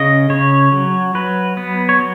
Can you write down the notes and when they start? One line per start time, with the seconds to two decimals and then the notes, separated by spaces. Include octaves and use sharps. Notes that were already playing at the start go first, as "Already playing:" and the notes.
Already playing: C#3 D#5
0.30 C#3 C#5
0.72 F#3
1.15 F#3 B4
1.57 B3
1.89 C#5
1.99 F#3